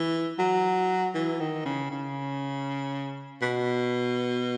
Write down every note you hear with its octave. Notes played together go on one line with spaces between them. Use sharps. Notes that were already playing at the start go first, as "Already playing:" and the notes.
Already playing: E3
F#3
E3
D#3
C#3
C#3
B2